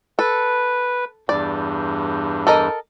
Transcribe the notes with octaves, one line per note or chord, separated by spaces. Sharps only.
A4 B4
E2 G2 D5
A4 A#4 D#5